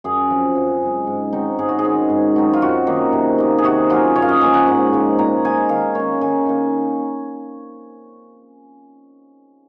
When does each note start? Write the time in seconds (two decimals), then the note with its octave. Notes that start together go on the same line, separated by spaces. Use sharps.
0.04 F#2 G#4
0.30 F3 C4
0.56 F#2
0.82 C#3 G#3
1.07 G#2
1.33 F#3 C4 D#4
1.58 G#2 G#4
1.69 F#4
1.79 G#4
1.85 D#3 G#3 C#4
2.10 G#2
2.36 F#3 C4 D#4
2.53 F4
2.61 F#2 F#4
2.87 D#3 A#3
3.13 C3
3.38 D#3 A#3
3.58 G#4
3.64 C3 F#4
3.90 F#3 A#3 C#4 F4
4.16 F#2 C#5
4.22 F5
4.29 D#5
4.41 F3 A#3 C#4 G#5
4.54 F#5
4.67 G#2
4.93 F3 G#3
5.19 A#2 A#5
5.45 G#3 D#4 G#5
5.69 D#3 F5
5.95 A#3 C#4 C#5
6.21 D#3 G#5
6.46 A#3 D#4